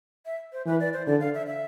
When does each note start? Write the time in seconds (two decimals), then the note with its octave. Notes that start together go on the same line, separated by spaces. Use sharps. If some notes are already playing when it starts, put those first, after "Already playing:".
0.26 E5
0.53 C5
0.66 E3 B4
0.80 D5
0.93 C5
1.07 D3 D5
1.20 F5
1.34 E5
1.47 E5